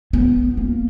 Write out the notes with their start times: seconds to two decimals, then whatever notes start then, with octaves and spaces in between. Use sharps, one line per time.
0.13 B3
0.57 A#3